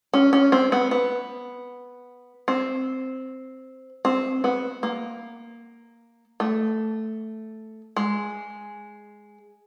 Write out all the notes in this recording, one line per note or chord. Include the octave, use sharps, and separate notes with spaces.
C#4
C#4
C4
B3
B3
C4
C4
B3
A#3
A3
G#3